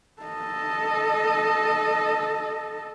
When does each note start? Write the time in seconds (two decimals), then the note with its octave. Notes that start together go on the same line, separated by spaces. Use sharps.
0.22 A4 D#5